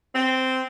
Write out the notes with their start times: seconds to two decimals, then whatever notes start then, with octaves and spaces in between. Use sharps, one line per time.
0.13 C4